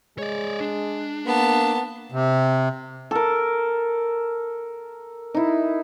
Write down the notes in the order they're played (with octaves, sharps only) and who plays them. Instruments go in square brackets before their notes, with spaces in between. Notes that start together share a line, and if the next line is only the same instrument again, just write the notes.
[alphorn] G#3 [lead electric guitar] C#5 D5
[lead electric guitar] D4
[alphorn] A#3 [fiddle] B3 A5
[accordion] C3
[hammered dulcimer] A4 A#4
D#4 E4